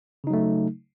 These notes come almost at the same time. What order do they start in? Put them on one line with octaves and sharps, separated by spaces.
C#3 D#4 F#3 A3